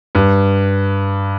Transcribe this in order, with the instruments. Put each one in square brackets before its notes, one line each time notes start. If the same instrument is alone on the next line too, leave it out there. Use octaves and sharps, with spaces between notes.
[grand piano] G2